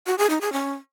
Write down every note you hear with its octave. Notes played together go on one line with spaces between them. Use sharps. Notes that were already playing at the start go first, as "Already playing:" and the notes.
F#4
G#4
D#4
G#4
C#4